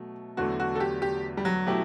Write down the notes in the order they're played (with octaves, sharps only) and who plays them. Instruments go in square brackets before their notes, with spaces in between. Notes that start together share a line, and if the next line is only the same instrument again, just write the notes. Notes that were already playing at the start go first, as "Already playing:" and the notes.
Already playing: [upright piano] B2 F#3 A3
[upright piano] E2 D3 F#3 A3 [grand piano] F#4
[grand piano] F#4
A4
G4
G4
G3
F#3
[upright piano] B2 A3 E4 G4